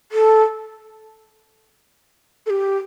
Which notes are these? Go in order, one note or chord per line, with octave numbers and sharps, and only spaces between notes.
A4
A4
G4